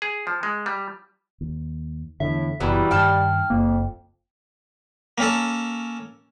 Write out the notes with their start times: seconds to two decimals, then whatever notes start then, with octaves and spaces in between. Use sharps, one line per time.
0.02 G#4
0.27 F3
0.43 G#3
0.66 G3
1.41 D#2
2.20 E2 A2 D3 E5
2.60 F#1 B2 E3 F#3 G3 E4
2.91 G2 D#3 G5 A5 F6
3.50 F#1 F2 A#3
5.18 A#3 C#4 A4